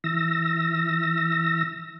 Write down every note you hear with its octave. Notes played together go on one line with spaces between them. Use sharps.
E3 E6 A#6